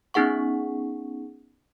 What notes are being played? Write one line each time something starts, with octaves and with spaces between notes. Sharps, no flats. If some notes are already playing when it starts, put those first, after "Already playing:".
B3 C#4 D#4 G#4 F#5 C#6